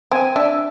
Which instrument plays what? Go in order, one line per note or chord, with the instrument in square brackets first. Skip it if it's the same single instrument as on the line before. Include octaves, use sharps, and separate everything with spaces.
[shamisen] C4 [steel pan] G#5
[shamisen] D4 [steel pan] E5